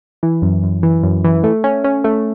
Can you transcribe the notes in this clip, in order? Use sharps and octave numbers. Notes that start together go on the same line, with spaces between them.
E3
F#2
F#2
E3
F#2
E3
A3
C#4
C#4
A3